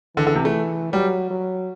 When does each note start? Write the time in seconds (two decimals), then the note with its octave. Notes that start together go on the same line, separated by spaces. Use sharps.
0.16 D3 E3
0.27 D3
0.35 C3
0.45 A3
0.93 F#3 G3
1.30 F#3